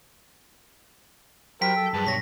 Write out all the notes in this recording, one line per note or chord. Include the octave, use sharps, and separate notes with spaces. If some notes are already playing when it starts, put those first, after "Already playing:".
F#3 G4 A#4 C5 G5 B6
A4
G2 G#4 B4 A5
B2 C#5 A#6 B6